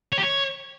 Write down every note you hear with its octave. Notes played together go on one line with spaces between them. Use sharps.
C#5
G4
C#5